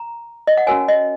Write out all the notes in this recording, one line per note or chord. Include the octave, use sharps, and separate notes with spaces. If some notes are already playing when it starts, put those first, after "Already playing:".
Already playing: A#5
D#5
F#5
C#4 F#4 A#4 C#5 G#5
D#5